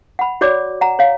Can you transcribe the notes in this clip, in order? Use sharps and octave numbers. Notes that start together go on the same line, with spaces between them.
F#5 B5
F#4 C#5 D5 D6
F#5 A#5
C#5 F5